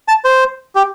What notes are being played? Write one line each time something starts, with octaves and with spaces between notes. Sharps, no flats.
A5
C5
G4